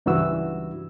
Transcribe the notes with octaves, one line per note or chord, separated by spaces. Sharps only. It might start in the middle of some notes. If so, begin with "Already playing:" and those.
C#2 G2 E3 F#4 E6